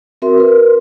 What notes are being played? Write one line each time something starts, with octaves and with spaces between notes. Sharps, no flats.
C4 F#4 A#4 E5 C6
A#4 B4